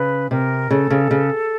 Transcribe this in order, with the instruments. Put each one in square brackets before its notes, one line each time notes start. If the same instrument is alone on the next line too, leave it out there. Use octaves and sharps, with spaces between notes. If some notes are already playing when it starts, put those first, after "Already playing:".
Already playing: [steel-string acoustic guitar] C#3 [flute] B4
[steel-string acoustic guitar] C3 [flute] A#4
[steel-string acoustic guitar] C#3 [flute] A4
[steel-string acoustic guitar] C#3
C#3